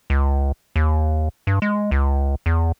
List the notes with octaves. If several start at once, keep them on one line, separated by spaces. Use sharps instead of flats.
C#2
D#2
G2
G#3
C#2
E2